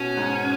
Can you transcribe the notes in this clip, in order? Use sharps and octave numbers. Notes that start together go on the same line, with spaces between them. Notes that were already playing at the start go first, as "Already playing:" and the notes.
Already playing: B2 C#4
G#2